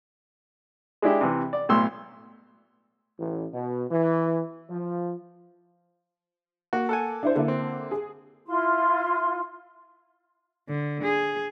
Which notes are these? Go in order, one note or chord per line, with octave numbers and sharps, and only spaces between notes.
G#3 D4 E4 G4
C3 E3
D5
B1 A2 C6 E6
A1
B2
E3
F3
A#3 F#4
A4 F#5 G#5
D4 E4 C5
D3 A#3 E4
C4
G#4
E4 F4 C6
D3
G#4